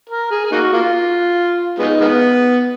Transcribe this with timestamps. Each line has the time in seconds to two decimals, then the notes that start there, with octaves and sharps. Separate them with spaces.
0.10 A#4
0.31 G#4
0.44 G#4
0.52 A#3 D#4 F#4
0.73 A#3 F4
1.79 G#3 B3 D#4
2.00 D#3 G#3 B3